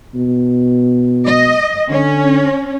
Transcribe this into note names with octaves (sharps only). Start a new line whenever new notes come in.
B2
D#5
D3 C#4